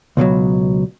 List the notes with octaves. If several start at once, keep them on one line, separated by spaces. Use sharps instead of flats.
C#2 B2 E3 F#3